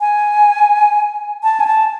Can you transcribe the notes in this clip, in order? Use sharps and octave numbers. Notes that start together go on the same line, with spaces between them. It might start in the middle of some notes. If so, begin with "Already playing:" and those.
G#5
A5
G#5
A5